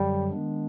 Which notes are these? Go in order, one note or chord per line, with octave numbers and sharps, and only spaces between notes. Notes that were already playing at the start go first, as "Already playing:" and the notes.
Already playing: F#2 D3 F#3 G3
D#3 G#3 B3 D4